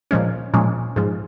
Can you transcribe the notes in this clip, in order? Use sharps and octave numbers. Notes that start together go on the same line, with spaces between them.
A#2 F3 G#3 C#4
A#2 F3 G#3 C#4
G#2 F3 G#3